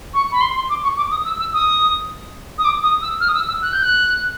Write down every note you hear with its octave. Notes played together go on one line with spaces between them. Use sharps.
C#6
B5
C6
C6
D6
C#6
D6
D#6
E6
E6
D#6
D#6
D6
D#6
E6
F6
D#6
E6
E6
F#6
G6
F#6